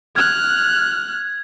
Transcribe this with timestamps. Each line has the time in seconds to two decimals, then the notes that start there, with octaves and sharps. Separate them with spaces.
0.16 F6 F#6 G#6